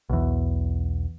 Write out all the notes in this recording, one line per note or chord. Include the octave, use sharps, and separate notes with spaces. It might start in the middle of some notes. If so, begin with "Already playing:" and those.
B1 E2